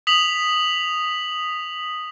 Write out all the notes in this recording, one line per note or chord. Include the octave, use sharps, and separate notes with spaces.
D#6 B6 F7 F#7